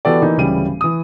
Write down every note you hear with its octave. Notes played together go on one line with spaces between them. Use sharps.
E3 B3 F#4 G4 A4 D5
E3 A#3 D#4
D1 C#3 E3 G3 D#7
E3 D#6